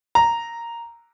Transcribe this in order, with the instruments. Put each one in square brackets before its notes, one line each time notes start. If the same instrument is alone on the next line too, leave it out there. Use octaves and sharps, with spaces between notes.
[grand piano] A#5